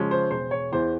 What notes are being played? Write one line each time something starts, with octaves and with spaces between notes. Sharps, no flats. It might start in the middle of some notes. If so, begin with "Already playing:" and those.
Already playing: C#3 F3 G#3 C#4
C5
E1 C5
C#5
E2 E3 C5